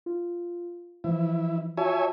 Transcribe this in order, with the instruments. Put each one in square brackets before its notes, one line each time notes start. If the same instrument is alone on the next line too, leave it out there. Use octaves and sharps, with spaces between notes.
[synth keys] F4
[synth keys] E3 F3 [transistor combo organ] E4
[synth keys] F4 F#4 A5 [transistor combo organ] C#5 E5 G#5